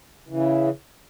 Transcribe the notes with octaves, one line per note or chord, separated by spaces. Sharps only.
C#3 E3